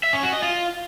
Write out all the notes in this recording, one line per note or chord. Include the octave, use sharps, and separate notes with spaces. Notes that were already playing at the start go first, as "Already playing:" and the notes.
E5
C#4
F#4
D#5
F4